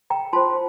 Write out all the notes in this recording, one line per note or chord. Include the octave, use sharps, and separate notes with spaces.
G5 A#5
F4 C5 A5 C6